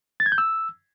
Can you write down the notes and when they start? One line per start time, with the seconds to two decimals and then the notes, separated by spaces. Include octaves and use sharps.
0.20 A6
0.26 G#6
0.32 G6
0.38 E6